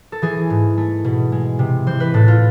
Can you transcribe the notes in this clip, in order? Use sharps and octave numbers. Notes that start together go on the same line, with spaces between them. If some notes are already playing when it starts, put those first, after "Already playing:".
A4
E3 G#4
G#2
A3
B2
G#3
C3
E3 C5
B4
A2 A4
F4